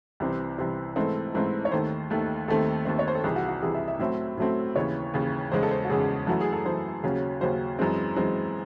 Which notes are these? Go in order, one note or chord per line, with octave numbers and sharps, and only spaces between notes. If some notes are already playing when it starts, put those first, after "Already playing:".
C2 C3 E3 C4
C2 C3 E3 C4
G#2 E3 A3 C4 A4
G#2 E3 A3 C4
C#5
D#2 D#3 A3 C5
D#2 D#3 A3
D#2 D#3 A3 C4 A4
D#2 D#3 A3 C4
C#5
C5
A4
C2 C3 E3 G#4
F#4
F#4
C2 C3 E3 G#4
E5
E5
A2 F#3 A3 C4 E5
A2 F#3 A3 C4
D#2 C#3 E3 C#5
D#2 C#3 E3
E2 C#3 G#3 C5
A4
C5
F#4
E2 C#3 G#3 G#4
F#2 E3 A3 F#4
G#4
A4
F#2 E3 A3 C5
D#2 C#3 F#3 C#4
D#2 C#3 F#3 C#4 C5
F#2 E3 G#3 C4
F#2 E3 G#3 C4